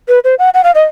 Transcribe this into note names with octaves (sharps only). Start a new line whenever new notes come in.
B4
C5
F#5
F#5
F5
D#5